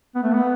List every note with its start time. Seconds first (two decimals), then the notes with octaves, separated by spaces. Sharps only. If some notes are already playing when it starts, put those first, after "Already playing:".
0.15 B3
0.23 A3
0.33 B3